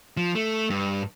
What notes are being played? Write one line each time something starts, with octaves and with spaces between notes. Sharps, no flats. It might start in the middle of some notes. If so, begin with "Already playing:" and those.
F3
A3
G2